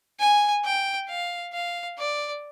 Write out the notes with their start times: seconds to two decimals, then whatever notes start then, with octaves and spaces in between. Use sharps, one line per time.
0.20 G#5
0.65 G5
1.10 F5
1.54 F5
1.99 D5